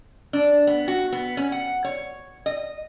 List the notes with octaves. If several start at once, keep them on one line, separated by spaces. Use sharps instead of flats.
D4
B3
F#4
B3
C#4
F#5
C#5
D#5